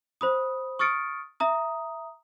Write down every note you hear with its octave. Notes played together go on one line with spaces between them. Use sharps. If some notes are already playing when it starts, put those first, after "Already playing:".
C5 B5 D#6
C#6 D#6 F6 A6 C#7 D7
E5 A#5 D#6